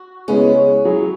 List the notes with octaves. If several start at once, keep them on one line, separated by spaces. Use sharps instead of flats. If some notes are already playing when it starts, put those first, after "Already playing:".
Already playing: F#4
C#3 G#3 B3 C#4 E4
F#3 E4 G#4